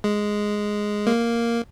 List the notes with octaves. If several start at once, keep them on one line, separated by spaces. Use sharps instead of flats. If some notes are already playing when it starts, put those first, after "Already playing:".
G#3
A#3